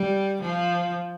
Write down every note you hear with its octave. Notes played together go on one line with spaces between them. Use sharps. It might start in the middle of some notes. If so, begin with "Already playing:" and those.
Already playing: G3
F3